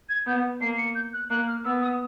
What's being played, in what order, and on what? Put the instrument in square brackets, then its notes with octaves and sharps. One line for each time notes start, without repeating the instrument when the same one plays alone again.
[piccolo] G#6
[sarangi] B3 [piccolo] G6
[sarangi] A#3 [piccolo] C7
[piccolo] C#7
G6
F#6
[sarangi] A#3 [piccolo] F#6
[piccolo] F6
[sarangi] B3 [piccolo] E6
[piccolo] D#6